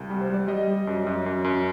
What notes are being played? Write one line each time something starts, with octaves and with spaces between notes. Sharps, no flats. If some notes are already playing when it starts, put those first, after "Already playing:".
Already playing: C2
G3
C5
G3 D5
G3 D#5
G3
F#2
F#2
F#2
F#2